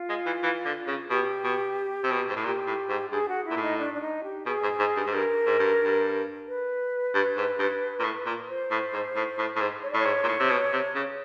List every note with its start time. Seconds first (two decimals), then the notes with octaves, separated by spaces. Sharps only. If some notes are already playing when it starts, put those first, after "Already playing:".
Already playing: F4
0.09 G#3
0.26 E3
0.43 E3
0.65 D3
0.88 C#3
1.10 B2 G4
1.44 B2
2.04 C3
2.11 B2
2.29 G#2
2.36 A2
2.44 A#2 G4
2.67 A2
2.89 G#2
3.11 G2 G#4
3.29 F#4
3.45 E4
3.51 A#2
3.56 A2
3.62 D#4
3.79 D4
3.94 D4
4.01 D#4
4.24 G4
4.46 B2 G#4
4.63 G#2
4.80 G#2
4.96 G2
5.07 G#2
5.13 G2 A#4
5.46 G#2
5.59 G2
5.84 G2
6.48 B4
7.14 G2
7.37 G#2
7.59 G2
8.00 A#2
8.04 A2
8.26 A#2
8.48 C5
8.71 A2
8.93 G#2
9.16 A2
9.39 A2
9.56 A2
9.61 G#2
9.83 C#5
9.91 D5
9.94 A2 C#5
10.06 G#2
10.24 A#2
10.28 A2
10.40 C3
10.50 B2
10.73 C3
10.95 C#3